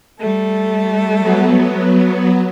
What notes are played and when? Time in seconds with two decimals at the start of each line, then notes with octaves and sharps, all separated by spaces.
0.19 G3 A3 A4
1.20 F#3 B3